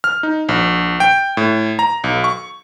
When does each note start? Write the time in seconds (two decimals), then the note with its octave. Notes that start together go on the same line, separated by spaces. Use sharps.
0.04 F6
0.23 D#4
0.49 A#1
1.00 G5
1.37 A2
1.79 A#5
2.04 B1
2.24 C#6